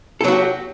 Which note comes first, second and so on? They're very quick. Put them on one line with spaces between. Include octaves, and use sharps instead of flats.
A4 F#3 F#4 G4